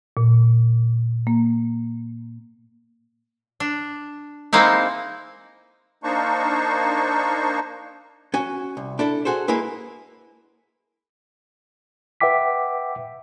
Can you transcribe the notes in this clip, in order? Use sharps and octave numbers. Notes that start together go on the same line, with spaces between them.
A#2
A#3
D4
G#3 A#3 C4 D#4 E4
A#3 D4 D#4 C5 C#6
C#4 F#4 G#5
C2
D4 E4 A4
F#4 G#4 A4 C5
G#3 A#3 E4 B4
B4 E5 F#5 G5 D6 B6